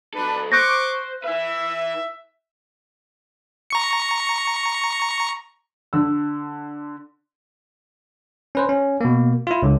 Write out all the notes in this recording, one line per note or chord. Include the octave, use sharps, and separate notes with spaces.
F#3 D4 A4 B4
C5 C#6 D6 F#6 G6 A#6
E4 B4 E5
A#5 C#6 C#7
D3 E6
C#4 B4 C5
C#4
B2 A#3
E4 F4
C#2 D3